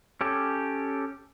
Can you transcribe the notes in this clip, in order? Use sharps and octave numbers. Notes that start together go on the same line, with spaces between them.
C#4 G4 A4